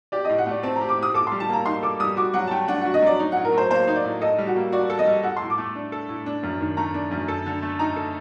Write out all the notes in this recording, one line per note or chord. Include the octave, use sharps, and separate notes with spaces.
G4 D5
A2 D#5
F#5
A3 D5
C4 A5
A#5
G4
D6
A2 D#6
A4 D6
G3 C6
A5
A#3 A#5
D#4 C6
A4 D6
G3 D#6
F#4 D6
F#3 F#5
A5
A3 G5
D4 F#5
F#4 F#5
D#5
F#3 D5
D#4
A2 F#5
A#4
F#3 C5
A#3 C5
D#4
D5
A2
A4 D#5
G3
F#4
A#3
F#4 D5
A4
D#5
G3
A4 F#5
A2 C6
D6
A3
D4
A4
A2
D4
F#2
D#3
A3 A#5
D4
F#2
A4
D3
A3
D#4 A#5
A4